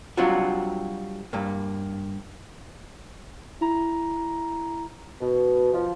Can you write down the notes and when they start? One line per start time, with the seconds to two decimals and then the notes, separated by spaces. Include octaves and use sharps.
0.17 F#3 G3 C4 D4 F4 F#4
1.33 G2 A#3
3.61 E4 A#5
5.20 B2
5.73 F3